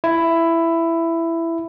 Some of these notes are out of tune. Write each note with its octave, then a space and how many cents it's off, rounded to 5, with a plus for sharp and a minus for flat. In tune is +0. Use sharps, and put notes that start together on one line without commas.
E4 +10